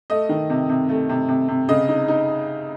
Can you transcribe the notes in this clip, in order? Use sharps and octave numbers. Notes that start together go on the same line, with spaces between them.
A3 D#5
D#3
C3
C3
A3
C3
C3
C3
C#3 D#5
D#4
D#4